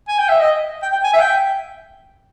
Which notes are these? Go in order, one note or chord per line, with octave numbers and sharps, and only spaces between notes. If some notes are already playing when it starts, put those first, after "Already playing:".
G#5
G5
E5
D#5
G5
G5
G#5
E5
G5